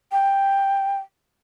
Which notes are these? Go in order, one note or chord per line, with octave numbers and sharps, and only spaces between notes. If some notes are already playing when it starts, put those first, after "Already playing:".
G5